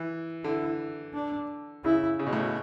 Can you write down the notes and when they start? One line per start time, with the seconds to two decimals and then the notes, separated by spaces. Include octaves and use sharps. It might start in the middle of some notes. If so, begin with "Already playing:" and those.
Already playing: E3
0.44 D3 E4
1.14 D4
1.84 C#3 E4
2.19 C#3
2.27 B2
2.33 A2
2.41 B2